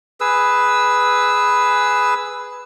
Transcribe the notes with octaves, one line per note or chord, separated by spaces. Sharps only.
G#4 B4 E6